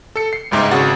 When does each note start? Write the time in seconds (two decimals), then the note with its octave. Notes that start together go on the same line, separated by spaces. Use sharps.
0.16 A4 C#7
0.33 C7
0.51 G1 C#2 G#2 D#4 E5 D6
0.71 G#1 C#3 F#4 F#5 A6